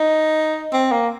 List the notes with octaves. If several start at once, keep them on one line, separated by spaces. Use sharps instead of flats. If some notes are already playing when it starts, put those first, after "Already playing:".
Already playing: D#4
C4
A#3